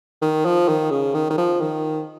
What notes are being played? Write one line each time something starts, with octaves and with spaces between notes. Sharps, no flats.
D#3
F3
D#3
C#3
D#3
D#3
F3
D#3